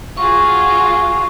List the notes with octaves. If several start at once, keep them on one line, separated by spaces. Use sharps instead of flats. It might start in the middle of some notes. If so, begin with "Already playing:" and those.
F4 F#4 G#4 C#6